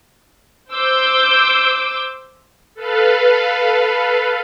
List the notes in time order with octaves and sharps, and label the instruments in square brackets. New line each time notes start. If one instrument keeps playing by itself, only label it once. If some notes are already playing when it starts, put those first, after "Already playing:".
[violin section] C5 D6 E6 G6
[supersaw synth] A4 B4 F5